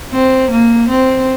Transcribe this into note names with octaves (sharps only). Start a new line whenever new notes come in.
C4
A#3
C4